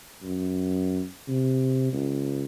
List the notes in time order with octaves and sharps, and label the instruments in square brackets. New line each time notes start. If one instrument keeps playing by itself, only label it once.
[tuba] F#2
C3
C#2